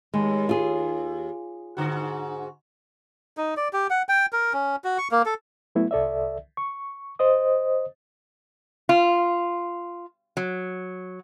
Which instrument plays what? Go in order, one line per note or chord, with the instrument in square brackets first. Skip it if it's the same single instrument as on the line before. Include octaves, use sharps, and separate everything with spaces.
[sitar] D#2 [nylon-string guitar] G#3
[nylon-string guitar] F4 G#4
[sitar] G#2 D3 F#4
[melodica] D#4
D5
G4
F#5
G5
A#4
C#4
F#4
C#6
A#3
A4
[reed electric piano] F#3 A3 B3 E4
C2 A4 D5 E5
C#6
C5 D#5 D#6
[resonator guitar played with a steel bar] F4
F#3